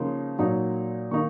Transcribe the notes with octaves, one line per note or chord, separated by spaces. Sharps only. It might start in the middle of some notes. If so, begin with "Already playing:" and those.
Already playing: C#3 F3 A#3 D#4 C6
A#2 F#3 A#3 D#4
D#3 A#3 D#4 C#6